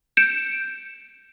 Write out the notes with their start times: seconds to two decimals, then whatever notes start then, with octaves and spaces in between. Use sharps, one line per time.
0.17 G6 C#7 D7 E7